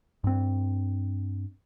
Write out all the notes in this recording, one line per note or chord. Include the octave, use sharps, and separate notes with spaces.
G2 C4